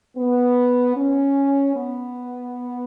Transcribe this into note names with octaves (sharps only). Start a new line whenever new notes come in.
B3
C#4
B3